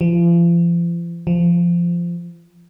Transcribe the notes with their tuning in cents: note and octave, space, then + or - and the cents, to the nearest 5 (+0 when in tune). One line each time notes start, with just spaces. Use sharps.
F3 -40
F3 -15